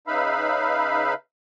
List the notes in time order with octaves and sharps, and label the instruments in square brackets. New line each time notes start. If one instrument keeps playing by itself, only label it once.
[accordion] C#3 D#4 B4 E5 F5 B5